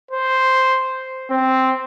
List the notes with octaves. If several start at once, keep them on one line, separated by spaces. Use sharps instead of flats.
C5
C4